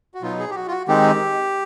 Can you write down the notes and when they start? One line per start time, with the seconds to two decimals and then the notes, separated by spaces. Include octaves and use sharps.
0.14 F#4
0.22 B2 F#3 B3 D#4 F4
0.39 G#4
0.51 G4
0.55 F#4
0.68 F4
0.71 F#4
0.88 D#3 G#3 C4 D#4 G4